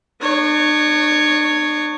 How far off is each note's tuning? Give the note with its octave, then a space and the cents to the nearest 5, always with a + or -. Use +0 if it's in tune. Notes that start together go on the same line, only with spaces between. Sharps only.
D4 +45 C#5 +0